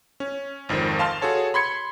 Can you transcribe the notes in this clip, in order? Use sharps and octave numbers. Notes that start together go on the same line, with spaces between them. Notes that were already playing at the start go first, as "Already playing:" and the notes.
C#4
G#1 F2 D#3 C5
F5 A5 C6 F6
F#4 G#4 A4 C#5 A5
B5 C6 G#6 C#7